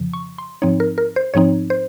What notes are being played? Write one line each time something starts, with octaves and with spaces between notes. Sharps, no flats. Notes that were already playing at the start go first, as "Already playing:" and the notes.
Already playing: F2 C#3 F3
C#6
C6
G#2 F3 C4 D#4 C#5
A#4
A#4
C5
G#2 F3 C4 D#4 C#5
C5